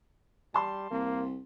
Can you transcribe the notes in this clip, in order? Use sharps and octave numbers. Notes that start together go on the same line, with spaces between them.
G3 A5 C6
C2 A#3